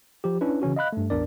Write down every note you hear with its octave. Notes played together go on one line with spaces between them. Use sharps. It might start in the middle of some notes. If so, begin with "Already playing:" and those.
F3 G4
C#4 D4 E4 B4
C#3 E3 C#4 F#4
D#5 F5 B5 F#6
G2 A3
A1 E2 D4 A#4 D5